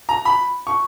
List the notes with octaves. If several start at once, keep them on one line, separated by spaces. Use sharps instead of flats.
A#5
B5
C#6